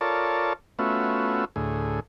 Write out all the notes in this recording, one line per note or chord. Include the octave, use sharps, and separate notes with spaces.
F4 A4 A#4 C#5 D5 A5
A3 B3 C#4 F4 F#4 E5
D2 A2 G#4